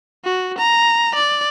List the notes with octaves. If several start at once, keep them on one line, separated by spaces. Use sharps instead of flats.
F#4
A#5
D5